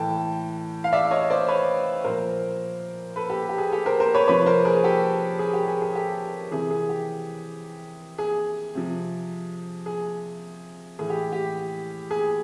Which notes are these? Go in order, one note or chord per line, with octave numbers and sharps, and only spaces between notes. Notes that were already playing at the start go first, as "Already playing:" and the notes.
Already playing: A2 E3 G5 A5
F5
D5 E5
C#5 D#5
C5 D5
B4 C#5
A#2 F3 A#4 C5
A4 B4
G4 A4
G4
G#4
G4 A4
A#4 C5
A#4 C5
B4 C#5
C3 F3 B4 C#5
A#4 C5
G#4 A#4
G4 A4
G#4
G4
G#4
G#4
G4 A4
C3 E3 G#4
G#4
G4
G#4
C3 F3
G#4
A2 E3 G#4
G4
G4
G#4